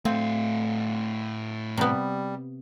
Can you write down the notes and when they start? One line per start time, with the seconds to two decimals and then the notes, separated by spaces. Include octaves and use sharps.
0.05 A2 A3 C4 F5
1.77 C3 G3 B3